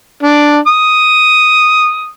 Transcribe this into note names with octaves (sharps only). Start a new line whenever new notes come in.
D4
D#6